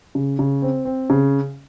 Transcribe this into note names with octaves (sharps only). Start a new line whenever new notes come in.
C#3
C#3
C4
C4
C#3